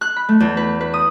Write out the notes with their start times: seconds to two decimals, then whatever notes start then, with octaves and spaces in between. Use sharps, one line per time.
0.01 F#6
0.16 B5
0.29 A3
0.40 E2
0.57 B4
0.81 B4
0.94 D#6